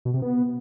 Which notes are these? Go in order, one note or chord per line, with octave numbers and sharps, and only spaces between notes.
B2
C3
B3